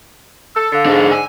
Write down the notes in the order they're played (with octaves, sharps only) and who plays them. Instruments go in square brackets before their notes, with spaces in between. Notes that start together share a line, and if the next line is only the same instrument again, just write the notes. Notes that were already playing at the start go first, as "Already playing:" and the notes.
[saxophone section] A4 [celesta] E6
[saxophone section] D3 [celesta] F5 E6 A6
[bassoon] G#2 [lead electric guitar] D4 G#4
[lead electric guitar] G#5 [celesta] E6